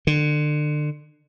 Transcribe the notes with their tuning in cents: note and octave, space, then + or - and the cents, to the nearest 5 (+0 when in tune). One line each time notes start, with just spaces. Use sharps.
D3 +30